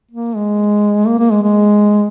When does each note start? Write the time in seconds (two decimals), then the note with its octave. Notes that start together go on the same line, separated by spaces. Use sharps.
0.11 A#3
0.36 G#3
1.07 A#3
1.19 A#3
1.31 G#3
1.43 G#3